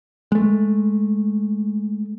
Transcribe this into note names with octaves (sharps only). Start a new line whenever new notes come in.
G#3 A3